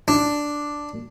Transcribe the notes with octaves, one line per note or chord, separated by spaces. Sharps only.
D4